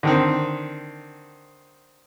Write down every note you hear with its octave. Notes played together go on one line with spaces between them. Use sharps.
D3 D#3 C4